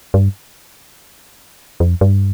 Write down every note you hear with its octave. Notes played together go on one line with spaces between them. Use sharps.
G2
F2
G2